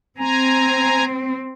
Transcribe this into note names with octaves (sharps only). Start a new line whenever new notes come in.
C4 G#5 A#5